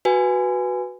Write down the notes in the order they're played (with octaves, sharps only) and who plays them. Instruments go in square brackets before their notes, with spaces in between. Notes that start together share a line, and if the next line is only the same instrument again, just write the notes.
[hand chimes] F#4 B4 G#5